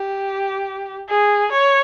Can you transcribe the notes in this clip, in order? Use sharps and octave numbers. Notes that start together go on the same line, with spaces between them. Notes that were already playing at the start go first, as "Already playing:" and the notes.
Already playing: G4
G#4
C#5